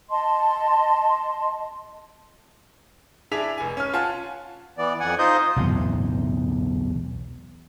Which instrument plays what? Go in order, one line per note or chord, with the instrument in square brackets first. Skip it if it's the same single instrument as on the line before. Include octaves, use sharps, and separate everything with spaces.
[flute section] D#5 A5 C6
[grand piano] D4 E4 G#4 E5 B6 F7
F1 G#5
C#4 F6
F4 F#5 G#5 A5
[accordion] E3 B3 D5
F2 F#5 G#5
D#4 F4 C5 D#5 D#6 G6
[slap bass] B1 E2 A2 C3